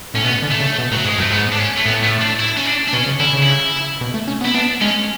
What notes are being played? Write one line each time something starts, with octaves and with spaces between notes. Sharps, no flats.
A2 C#4
B2 B3
D3
A3
C#3
B2
A2 F#3
G#2 G#3
F#2 A3
G#2 B3
D4
C#4
A3
A2 B3
A3
D4
E4
C#4
D4
D4
B2 C#4
C#3
D3 E4
C#3
E4
B2
A3
C#4
B3
E4
B3 D4
G#3 C#4